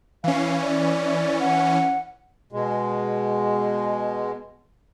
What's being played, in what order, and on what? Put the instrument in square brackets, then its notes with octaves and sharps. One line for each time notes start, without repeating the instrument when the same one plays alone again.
[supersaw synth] E3 C#4 [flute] F5
[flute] D5
F#5
[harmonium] B2 G#3